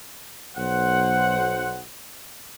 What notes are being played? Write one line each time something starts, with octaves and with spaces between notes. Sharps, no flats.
B1 C5 F#5